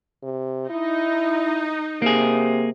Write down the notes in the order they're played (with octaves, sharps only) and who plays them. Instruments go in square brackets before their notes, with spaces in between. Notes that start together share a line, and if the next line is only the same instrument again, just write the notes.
[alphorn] C3
[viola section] D#4 [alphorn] E4
[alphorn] C3 [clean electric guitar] A#3 G#4